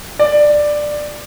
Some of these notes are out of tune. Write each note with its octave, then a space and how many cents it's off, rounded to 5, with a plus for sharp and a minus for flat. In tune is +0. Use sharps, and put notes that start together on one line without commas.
D5 +10